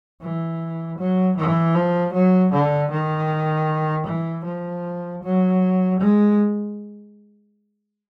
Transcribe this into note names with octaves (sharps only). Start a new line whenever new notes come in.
E3
F#3
E3
F3
F#3
D3
D#3
E3
F3
F#3
G#3